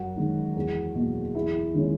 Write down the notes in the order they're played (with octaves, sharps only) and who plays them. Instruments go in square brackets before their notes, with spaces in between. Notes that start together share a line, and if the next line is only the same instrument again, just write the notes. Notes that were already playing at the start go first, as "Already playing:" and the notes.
Already playing: [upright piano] F#2 F#4
D#3 G#3 D#4
E2
B2 F#3 A#3
E2 E4
D#3 G#3 C#4